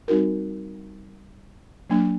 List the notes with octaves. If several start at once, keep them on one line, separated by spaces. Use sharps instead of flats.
G3 C4 D#4 F#4 A#4
F#3 A#3 D4